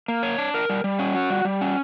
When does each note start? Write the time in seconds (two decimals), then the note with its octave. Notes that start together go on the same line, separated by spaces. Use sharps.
0.08 A#3
0.23 C#5
0.38 D4
0.54 A#4
0.70 G3
0.84 G3
0.99 C#4
1.15 F#4
1.30 G3
1.45 G3
1.61 C#4